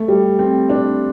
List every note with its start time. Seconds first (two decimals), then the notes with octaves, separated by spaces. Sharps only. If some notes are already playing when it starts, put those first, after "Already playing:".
Already playing: A3
0.08 G3
0.39 C4
0.70 D4